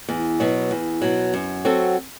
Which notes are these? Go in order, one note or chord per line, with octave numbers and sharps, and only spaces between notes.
E2
B2 F#3
E2
B2 F#3
F#2
F#3 C4 F#4 A4